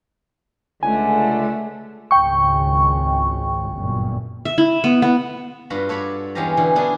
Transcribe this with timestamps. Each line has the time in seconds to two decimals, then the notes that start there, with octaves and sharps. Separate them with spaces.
0.83 C#2 D3 A3 G#5
2.11 G#1 C#2 C#3 G5 C#6
3.73 G1 F#2 A#2
4.45 E5
4.58 E4
4.84 B3
5.02 B3
5.70 G2 F4 F#4 B5
5.89 A4 C#5 D5 B5
6.35 E2 G#3 C#4 F4 G4 A#5
6.57 B2 D3 E3
6.75 B3 C#4 D4 E4 G#4